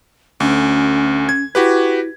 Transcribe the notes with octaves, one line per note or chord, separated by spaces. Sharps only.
D2 C#4
G#6
E4 F#4 G4 B4